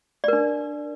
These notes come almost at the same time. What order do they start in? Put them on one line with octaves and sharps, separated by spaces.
D5 A#4 D4